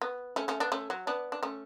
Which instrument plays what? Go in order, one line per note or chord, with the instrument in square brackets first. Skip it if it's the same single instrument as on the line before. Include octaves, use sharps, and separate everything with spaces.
[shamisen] B3
A3 C#4
A3 C#4
B3 D4
A3 C#4
F#3
B3 D4
D4
A3 C#4